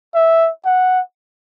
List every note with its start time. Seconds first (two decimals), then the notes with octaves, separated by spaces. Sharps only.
0.15 E5
0.65 F#5